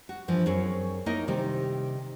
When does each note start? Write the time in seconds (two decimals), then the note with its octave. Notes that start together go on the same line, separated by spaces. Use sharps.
0.09 F#4
0.28 G2 E3 F3
0.46 F#2 C4 G#4 C#5
1.06 A#3 D#4 E4 C#5 D#5
1.28 C3 D#3 G3